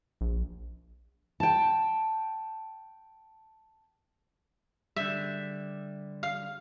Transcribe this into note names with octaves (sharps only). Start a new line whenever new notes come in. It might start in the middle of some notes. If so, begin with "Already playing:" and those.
A#1
G5 A5
D3 G3 E5
F5